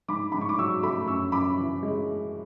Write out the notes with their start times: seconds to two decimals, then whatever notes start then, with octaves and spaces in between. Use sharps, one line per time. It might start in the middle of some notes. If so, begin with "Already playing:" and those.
0.08 G#2 B5 D6
0.32 G#2 B5
0.41 C#6
0.49 D6
0.59 F#3 C#6 E6
0.83 A3 B5 D6
1.08 F#2 C#6 E6
1.32 F#2 B5 D6
1.58 E3
1.83 G#3